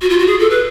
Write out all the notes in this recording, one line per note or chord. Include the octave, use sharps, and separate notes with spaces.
F#4
F4
F#4
G#4
A4
B4